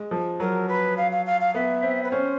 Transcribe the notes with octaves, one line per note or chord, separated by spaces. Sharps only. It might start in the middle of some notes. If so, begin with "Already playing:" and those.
Already playing: G#3
F3
F#3 A#4
B4
F5
F5
F5
F5
B3 E5
C4
B4
C#4 C5